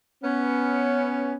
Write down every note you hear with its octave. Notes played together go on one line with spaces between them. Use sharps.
B3 C#4